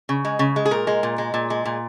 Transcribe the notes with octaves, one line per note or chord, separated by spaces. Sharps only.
C#3
G#3
C#3
G#3
G#4
A#2 A#4
G#3
A#2
G#3
A#2
G#3
A#2